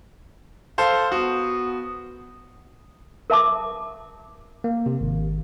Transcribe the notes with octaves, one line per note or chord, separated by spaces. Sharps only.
A4 C5 F5
B3 F#4 D#6
A#4 E5 A5 D6
A#3
C3
G#1